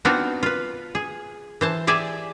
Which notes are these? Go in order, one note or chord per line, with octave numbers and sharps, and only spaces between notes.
B3 C4 D4 D#4 F4 F#4
F4 B4
G#4
E3 C5 A5
G4 G#4 D5 E5 G#5